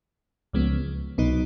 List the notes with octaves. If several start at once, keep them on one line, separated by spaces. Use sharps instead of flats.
C#2 C#3 F3 G#3 B3
C2 B2 F#3 B3 D#4